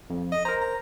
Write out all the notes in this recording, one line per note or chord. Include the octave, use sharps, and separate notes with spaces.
F2
D#5
A#4 C5 A#5
A#5